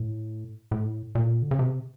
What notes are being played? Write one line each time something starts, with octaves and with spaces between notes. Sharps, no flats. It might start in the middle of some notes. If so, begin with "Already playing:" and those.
Already playing: A2
A2
A#2
D3
C#3
C3